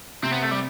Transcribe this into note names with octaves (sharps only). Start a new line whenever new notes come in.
C3 C4
B3
A3
G3